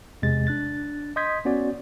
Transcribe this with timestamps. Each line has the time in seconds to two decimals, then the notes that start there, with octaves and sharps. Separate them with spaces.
0.22 E2 C3 G#3 A6
0.47 D4 F#6 A6
1.16 D#5 C6 D#6 G6 G#6 B6
1.45 B3 C#4 F#4 D5